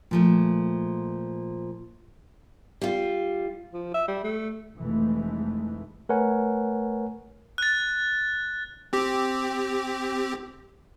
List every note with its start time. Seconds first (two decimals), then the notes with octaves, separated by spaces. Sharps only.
0.11 A#2 F3 A3
2.81 G3 F4
3.73 F3
3.94 E5
4.08 G3
4.24 A3
4.78 F1 E3 G#3 A3
6.09 A3 A#4 B4 C#5 F#5 G#5
7.58 F#6 A6
8.93 C4 G4